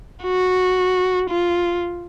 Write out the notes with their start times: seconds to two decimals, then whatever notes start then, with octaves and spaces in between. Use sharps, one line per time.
0.23 F#4
1.30 F4